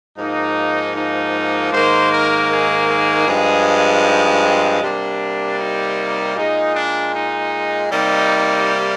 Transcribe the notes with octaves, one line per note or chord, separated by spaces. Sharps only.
G#2 F3 A#3 D#4
D#4
G#2 D#3 A#3 C5
A#4
G#4
G#4
G2 F3 G#3
D#4
C4
C3 G3 A#3 D4
D#4
A#2 G#3 D#4
D4
D#4
C3 G3 A#3 D#4